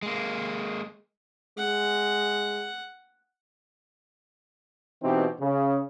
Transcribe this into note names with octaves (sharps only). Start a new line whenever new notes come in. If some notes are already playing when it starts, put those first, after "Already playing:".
G#3 A#3
G#3 F#5
B2 E3 C4 D#4 G4
C#3